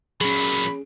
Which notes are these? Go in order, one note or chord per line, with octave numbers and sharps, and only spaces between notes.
A#2 F#3 C#4 G#4 B5